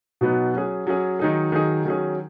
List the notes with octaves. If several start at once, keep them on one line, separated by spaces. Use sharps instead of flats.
B2 F#3 B3 D#4
F#3 C#4 G#4
F#3 C#4 G#4
D#3 F#3 D#4 G#4
D#3 F#3 D#4 G#4
D#3 F#3 C#4 G#4